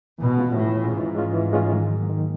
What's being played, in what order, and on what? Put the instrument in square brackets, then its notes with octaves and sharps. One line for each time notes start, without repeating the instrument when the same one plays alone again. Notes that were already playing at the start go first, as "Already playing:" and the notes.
[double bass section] B2 [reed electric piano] E3
[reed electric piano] G#3 C#4 F4
[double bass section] A2 [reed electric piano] E3
[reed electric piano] G#3 C#4 F4
[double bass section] G#2 [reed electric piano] E3
[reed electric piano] G#3 C#4 F4
E3
G#3 C#4 F4
D#3
F#3 A#3
D#3